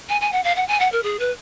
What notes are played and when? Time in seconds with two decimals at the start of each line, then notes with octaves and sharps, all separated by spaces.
0.09 G#5
0.21 G#5
0.32 F#5
0.44 F5
0.56 F#5
0.68 G#5
0.80 F#5
0.92 A#4
1.03 G#4
1.19 B4